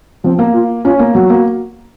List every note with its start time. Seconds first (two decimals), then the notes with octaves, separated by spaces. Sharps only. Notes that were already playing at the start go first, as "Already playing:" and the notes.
0.24 F3 C4
0.39 A#3
0.54 F4
0.85 C#4 F4
0.99 A#3
1.15 F#3 F#4
1.30 A#3